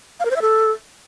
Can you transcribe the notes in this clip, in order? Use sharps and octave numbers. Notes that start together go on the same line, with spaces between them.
F5
A#4
C5
E5
A4